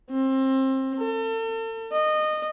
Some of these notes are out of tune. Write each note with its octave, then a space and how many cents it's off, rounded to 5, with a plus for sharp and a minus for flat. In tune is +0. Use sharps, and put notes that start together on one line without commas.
C4 +25
A4 +40
D#5 -20